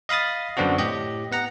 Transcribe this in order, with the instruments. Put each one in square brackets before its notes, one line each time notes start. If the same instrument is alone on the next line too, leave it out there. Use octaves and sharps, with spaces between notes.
[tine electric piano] D#5 F5 B5 D#6 A6
F#2 D3 B3 C4 D4 F#4
A2 G4 D#5
B3 F#5 A#5